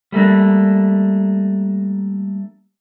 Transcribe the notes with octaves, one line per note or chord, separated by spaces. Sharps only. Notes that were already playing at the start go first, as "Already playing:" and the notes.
G3 A3 A#3 D4